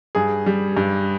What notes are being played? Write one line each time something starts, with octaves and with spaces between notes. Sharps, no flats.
G2 G#4
G3
G2